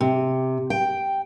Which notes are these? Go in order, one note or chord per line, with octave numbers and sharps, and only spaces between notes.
C3
G5